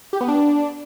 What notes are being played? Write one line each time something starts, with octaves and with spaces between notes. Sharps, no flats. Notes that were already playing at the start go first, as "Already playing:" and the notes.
G4
B3
D4